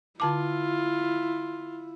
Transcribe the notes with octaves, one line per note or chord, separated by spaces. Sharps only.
D3 E4 F4 A5 D6